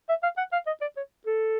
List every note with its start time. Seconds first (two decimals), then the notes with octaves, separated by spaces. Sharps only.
0.09 E5
0.23 F5
0.38 F#5
0.53 F5
0.67 D#5
0.81 D5
0.97 C#5
1.27 A4